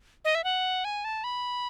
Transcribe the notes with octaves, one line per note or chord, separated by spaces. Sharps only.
D#5
E5
F#5
G#5
A5
B5